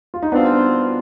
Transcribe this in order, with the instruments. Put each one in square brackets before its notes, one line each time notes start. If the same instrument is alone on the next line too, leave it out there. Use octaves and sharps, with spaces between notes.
[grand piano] F4
D#4
[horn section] B2 G3 C4 F4 [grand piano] B3 D4